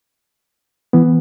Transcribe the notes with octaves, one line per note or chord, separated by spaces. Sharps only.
E3 B3